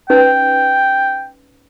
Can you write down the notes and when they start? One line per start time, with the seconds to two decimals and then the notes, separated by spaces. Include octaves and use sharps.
0.10 C#4 D#4 B4 G5